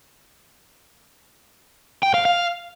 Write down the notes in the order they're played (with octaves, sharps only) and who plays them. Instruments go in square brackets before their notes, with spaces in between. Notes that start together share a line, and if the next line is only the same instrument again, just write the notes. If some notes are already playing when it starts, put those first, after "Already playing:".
[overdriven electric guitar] G5
F5
F5